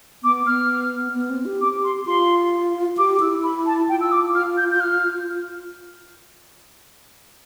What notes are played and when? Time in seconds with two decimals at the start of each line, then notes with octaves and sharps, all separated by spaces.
0.23 B3 D6
0.46 B3 F6
1.15 B3
1.30 C4
1.45 G4
1.61 D6
1.83 C6
2.06 F4 C6
2.97 G4 D6
3.20 E4 E6
3.43 B5
3.66 A5
3.88 F4 G5
4.01 E6
4.11 D6
4.35 F6
4.57 G6
4.71 G6
4.80 F6